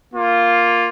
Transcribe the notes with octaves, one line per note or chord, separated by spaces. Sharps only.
A#3 F4